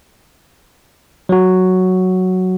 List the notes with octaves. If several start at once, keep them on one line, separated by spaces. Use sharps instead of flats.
F#3 F#4